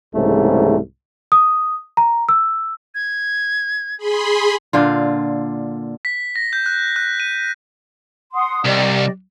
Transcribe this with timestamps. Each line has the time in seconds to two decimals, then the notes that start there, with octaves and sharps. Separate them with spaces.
0.15 C2 G#2 C#3 E3 A3
1.32 D#6
1.97 A#5
2.29 E6
2.95 G#6
3.97 G#4 B5 C6
4.73 A#2 D3 F4
6.05 B6
6.36 A#6
6.53 G6
6.66 F#6
6.96 F#6
7.20 D#7
8.33 F#5 C6 D#6
8.65 C2 G4 D5 D#5